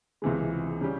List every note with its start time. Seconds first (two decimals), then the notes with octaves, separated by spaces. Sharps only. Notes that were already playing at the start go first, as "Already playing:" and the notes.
0.22 C#2 C3 E3 G#3
0.81 C#3 G3 C#4 G4